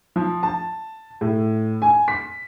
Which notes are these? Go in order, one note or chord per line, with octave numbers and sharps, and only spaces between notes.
F3
A5
A2
G#5
B6